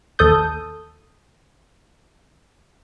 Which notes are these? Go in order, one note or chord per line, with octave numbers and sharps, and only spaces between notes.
A1 D#2 A4 D#6 G6